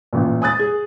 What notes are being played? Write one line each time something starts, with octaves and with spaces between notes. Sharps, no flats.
A1 A#2
G#5 D#6 F#6 A6
G#4